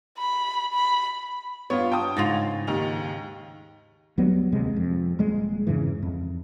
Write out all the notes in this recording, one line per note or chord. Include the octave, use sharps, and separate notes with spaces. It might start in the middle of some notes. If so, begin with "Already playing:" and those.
B5
B5
G2 B3 F4 C#5
G5 A5 D#6
G#2 C#3 F4 A6 A#6 F7
D#2 D#3 F7
D2 F#3 G3 B3
E1 D#2 C3 G#3
F2
D#1 G3 G#3
F2 G#2 C#3 E3
F2